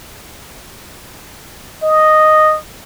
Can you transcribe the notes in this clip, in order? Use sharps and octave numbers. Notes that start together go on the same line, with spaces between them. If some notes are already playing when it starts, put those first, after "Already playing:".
D#5